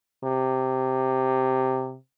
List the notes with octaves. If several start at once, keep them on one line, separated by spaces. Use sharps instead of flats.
C3